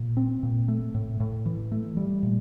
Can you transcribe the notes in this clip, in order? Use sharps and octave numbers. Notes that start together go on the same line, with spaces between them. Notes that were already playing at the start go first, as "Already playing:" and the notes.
Already playing: A#2
C4
A#2
A3
A2
A2
E3
A3
G3
A#2